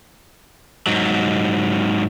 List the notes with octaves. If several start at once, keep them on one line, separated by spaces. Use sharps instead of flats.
G#2 F#3